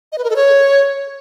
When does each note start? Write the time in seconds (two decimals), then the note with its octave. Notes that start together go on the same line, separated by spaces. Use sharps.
0.12 D#5
0.18 B4
0.24 A#4
0.30 A4
0.36 C#5